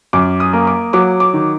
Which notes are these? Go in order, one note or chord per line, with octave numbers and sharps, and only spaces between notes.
F#2 D6
D#6
A#3
D6
F#3 D6
D6
D#3